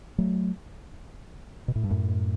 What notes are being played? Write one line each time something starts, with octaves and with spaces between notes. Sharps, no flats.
F#3 A3
B2
A2
G2
F#2 A2